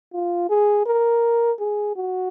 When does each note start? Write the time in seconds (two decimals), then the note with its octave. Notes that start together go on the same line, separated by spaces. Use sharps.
0.14 F4
0.50 G#4
0.86 A#4
1.60 G#4
1.96 F#4